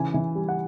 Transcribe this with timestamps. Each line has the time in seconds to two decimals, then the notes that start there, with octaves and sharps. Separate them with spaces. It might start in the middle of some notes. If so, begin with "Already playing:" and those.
Already playing: C#3 E3 G#5
0.14 E3
0.35 G3
0.49 F#5